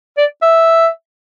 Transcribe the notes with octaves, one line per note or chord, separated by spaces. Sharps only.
D5
E5